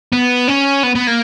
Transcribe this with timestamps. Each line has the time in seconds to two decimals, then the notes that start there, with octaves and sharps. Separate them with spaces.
0.13 B3
0.48 C#4
0.84 B3
0.96 B3
1.07 A#3